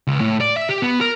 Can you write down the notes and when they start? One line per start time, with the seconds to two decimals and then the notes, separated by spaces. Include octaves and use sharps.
0.07 C#2
0.21 A2
0.41 D5
0.57 E5
0.69 G4
0.82 B3
1.01 A#4